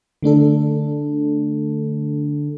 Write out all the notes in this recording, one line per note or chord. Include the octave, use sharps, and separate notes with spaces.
D3 A3 D4 A4